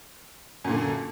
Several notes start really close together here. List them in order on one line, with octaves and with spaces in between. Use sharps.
F#2 A#2 D3